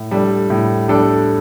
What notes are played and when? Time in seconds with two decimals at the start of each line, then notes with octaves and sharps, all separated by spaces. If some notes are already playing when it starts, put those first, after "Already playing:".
Already playing: A2
0.11 G3 D4 A4
0.50 A2
0.88 G3 D4 A4